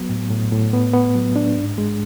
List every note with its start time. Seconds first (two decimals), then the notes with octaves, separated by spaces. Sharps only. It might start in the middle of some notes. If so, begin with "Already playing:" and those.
Already playing: F#3 B3
0.09 A2
0.31 A2
0.52 A2
0.73 B3
0.94 B3
1.15 F#3
1.36 D4
1.58 G#2
1.78 G#3